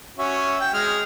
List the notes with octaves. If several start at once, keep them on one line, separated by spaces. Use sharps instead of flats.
C#4 F#4 E5
G5
G#3 F6